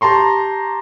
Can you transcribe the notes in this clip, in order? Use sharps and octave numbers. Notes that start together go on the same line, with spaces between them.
G4 A5 A#5 C6 C#6